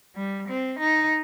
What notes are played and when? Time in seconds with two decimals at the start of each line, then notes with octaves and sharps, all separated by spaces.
0.15 G3
0.48 C4
0.79 D#4